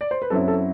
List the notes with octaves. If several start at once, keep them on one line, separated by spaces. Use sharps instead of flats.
D5
C5
B4
F#2 F#3 C4 E4 A4
A4